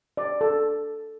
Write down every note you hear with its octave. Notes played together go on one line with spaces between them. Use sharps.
D5
A4